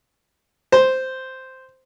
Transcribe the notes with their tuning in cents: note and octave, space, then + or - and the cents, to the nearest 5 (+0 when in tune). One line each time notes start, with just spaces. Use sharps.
C5 -5